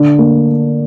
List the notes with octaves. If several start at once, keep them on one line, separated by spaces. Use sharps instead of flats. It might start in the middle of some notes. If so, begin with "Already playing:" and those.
Already playing: D3 D4
A#3